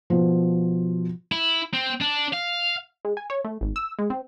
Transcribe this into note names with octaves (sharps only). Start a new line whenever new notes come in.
B2 F3
E4
C4
D4
F5
G#3
G#5
C#5
A3
G#1
E6
G#3
C4